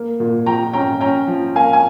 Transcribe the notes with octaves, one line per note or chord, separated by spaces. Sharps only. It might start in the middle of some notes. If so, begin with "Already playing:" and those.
Already playing: A#3
A#2
F3 G5 A#5
C#4 G5 A#5
C#4 G5 A#5
F3
A#3 F5 G#5
G#5